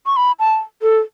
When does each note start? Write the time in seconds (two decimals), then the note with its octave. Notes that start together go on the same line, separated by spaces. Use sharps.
0.06 C#6
0.16 B5
0.39 A5
0.82 A4